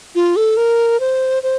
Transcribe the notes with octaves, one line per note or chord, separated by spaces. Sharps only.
F4
A4
A#4
C5
C5